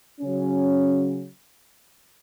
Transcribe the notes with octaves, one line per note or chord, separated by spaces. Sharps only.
C#3 F#3 C#4